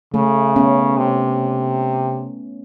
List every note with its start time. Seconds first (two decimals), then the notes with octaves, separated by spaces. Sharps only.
0.14 C#3 A3
0.56 B3 C#4
0.98 C3